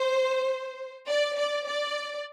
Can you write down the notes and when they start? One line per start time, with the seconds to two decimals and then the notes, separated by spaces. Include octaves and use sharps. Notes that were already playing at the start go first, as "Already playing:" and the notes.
Already playing: C5
1.09 D5
1.38 D5
1.67 D5